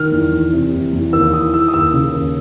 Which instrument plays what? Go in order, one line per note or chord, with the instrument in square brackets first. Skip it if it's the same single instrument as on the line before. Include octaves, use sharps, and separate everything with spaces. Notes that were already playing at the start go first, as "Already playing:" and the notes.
Already playing: [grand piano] D#3 F6
E2
E2
C3
E2
E2
D#2 E6
E6
E3 D#6
E3 E6
D#6
D#2 E6
C#3
D#2